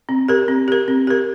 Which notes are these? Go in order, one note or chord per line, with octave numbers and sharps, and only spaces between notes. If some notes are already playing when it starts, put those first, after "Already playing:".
C4
G4 A#4
C4
G4 A#4
C4
G4 A#4